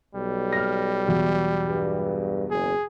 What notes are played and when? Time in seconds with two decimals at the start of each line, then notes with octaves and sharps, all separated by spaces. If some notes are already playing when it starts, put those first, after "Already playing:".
0.15 B1 G3
0.53 F6 A#6
1.07 E2 B2 F#3
1.67 G2
2.51 F#1 G#4